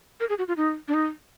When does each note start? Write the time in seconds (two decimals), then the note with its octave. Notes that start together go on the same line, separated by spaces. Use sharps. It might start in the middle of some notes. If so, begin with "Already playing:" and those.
0.20 A#4
0.29 G#4
0.38 F#4
0.48 F4
0.57 D#4
0.88 D4
0.94 D#4